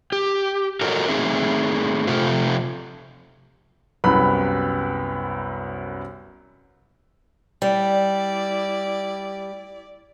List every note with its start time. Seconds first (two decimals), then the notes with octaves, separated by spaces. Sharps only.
0.12 G4
0.81 F#4 A4 A#4 C#5 D#5 A#5
1.08 A3 C4 D#4 G#4 E5
2.07 C3 F3 A3 F4 A4 C5
4.04 C2 F#2 B3 B5
7.62 G3 E4 D5